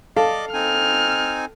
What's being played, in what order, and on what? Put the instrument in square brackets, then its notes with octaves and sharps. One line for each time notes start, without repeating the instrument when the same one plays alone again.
[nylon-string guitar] A4 [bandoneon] D5 D#5 D6 [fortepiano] F5
[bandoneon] C4 D#4 G#5 [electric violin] F6